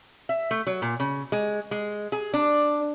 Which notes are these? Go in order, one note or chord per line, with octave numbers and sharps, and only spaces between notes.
E5
A3
F#3
A#2
C#3
G#3
G#3
G#4
D4